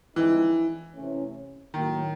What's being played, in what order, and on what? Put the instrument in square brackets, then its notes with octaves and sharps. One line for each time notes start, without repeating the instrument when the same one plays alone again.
[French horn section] D3 F3 G#3 C4 D#4 [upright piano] E3
[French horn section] C3 E3 A3 C#4
[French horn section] A2 F#3 A#3 [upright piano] D#3